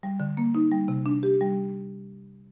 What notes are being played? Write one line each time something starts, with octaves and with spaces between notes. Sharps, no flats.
G3
D3
A#3
D#4
G3
C3
D4
G4
G3